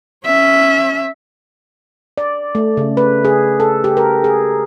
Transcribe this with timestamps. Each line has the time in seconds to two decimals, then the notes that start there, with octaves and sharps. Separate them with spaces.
0.25 C#4 E5
2.18 D5
2.55 A3
2.77 C#3
2.97 B4
3.25 G#4
3.60 A4
3.84 G4
3.97 A#4
4.24 G#4